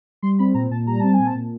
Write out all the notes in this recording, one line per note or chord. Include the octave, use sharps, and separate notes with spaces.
G3 C6
C4 B5
A#2 A#5
A#2 A5
G3 A#5
C4 A5
G#5
A#2
A5
A#2